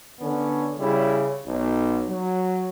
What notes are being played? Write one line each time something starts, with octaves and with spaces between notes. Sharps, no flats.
D3 B3 C#4
C#3 G3 E4
B1
F#3